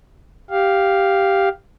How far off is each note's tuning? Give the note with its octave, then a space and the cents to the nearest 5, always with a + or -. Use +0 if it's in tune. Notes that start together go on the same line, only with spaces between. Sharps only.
G4 +0 F5 +0